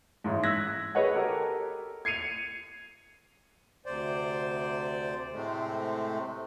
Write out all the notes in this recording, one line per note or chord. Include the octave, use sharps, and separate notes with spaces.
A1 G#2
E6 F#6 G#6 A#6 B6
G#4 B4 C#5 D#5 F#5
G4 A4 A#4
G#6 C7 C#7 D#7 F7
D2 C3 C5 D5
A2 C3 G#3 A3 C4